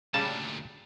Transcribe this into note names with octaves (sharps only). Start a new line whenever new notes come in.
D2 A#2 C#3 G3 A5